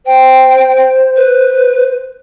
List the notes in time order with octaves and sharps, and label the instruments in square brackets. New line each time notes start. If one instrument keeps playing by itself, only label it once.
[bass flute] C5 [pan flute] G5
[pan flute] B4